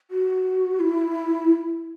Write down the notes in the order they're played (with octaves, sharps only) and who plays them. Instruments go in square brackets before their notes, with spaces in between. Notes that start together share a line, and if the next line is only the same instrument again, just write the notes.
[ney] F#4
E4